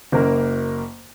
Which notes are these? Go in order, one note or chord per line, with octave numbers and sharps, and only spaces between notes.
F#1 F#2 A#3 A#4